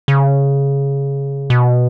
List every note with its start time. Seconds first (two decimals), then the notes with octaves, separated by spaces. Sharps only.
0.08 C#3
1.50 B2